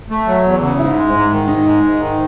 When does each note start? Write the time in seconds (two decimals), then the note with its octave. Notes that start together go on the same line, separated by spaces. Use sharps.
0.10 A3
0.27 F#3
0.44 E2
0.61 C#3
0.79 G#2 E4
0.96 G#3
1.13 G#2
1.31 D#3
1.48 G#2 D#4
1.65 G#3
1.84 G#2
2.00 D#3